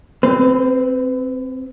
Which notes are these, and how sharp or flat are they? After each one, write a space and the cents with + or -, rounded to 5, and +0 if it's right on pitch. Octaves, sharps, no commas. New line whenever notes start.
C4 +0 B4 +35